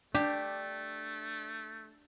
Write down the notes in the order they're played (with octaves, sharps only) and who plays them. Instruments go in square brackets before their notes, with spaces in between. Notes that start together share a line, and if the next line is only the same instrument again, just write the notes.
[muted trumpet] A3 [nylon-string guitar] D4 [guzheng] G4